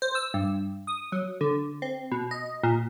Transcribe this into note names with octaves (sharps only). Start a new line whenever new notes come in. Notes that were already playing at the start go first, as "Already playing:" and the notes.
C5
E6
G2
D#6
F#3
D3
C4
B2
D#5
A#2